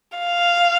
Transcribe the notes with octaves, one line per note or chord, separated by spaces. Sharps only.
F5